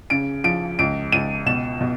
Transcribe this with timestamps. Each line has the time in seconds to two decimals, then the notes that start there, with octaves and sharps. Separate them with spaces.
0.10 C#3 D7
0.44 F3 D7
0.79 C#2 D7
1.12 C#2 D#7
1.46 B2 E7
1.81 B2